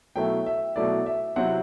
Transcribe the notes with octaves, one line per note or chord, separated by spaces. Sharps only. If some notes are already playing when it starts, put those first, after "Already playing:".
B2 F#3 A3 E4 G5
E5
B2 F#3 A3 E4 D5
E5
C3 F#3 C4 E4 F#5